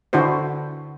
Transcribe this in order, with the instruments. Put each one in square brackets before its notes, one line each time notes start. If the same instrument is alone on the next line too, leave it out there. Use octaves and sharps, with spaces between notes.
[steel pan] D3 D4 E4 F#4 C5